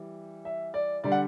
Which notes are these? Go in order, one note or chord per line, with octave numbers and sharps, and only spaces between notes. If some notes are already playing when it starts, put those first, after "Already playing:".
Already playing: E3 G3
E5
D5
D3 G3 D5
F#5